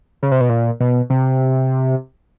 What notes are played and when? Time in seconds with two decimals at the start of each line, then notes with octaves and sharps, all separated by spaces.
0.23 C#3
0.32 C3
0.41 B2
0.49 A#2
0.80 B2
1.10 C3